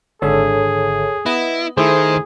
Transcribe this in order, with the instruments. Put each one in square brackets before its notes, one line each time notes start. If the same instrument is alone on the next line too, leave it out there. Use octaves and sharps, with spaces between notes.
[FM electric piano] G#1 D3 E5 [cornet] G#4 [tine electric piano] A4 C#5
[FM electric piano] B3 D#5 [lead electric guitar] E4
[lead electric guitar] D#3 [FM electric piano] A3 E4 [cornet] G#4 [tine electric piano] C5 C6